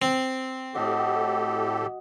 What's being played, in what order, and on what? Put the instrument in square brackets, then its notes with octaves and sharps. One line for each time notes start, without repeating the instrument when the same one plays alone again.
[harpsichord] C4
[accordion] A2 G4 A4 [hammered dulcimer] F#4 D#5